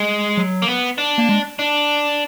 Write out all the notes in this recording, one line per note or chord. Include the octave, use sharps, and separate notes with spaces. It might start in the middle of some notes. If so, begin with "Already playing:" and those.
Already playing: G#3
F#3
A#3
B3
D4
A#3
G#3
D4